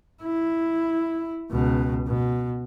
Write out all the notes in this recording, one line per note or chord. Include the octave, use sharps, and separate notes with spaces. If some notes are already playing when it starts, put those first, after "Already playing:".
E4
C#2 B2
B2